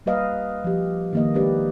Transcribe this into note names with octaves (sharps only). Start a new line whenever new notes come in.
G3 A#3 B4 D#5 F5
F3 G4
D#3 A#3 D#5
G#3 B3 D4 G4 B4 D5